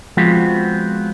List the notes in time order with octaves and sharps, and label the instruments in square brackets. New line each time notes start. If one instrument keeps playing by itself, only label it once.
[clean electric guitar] F3 G#3 B3 C4 F4 F#4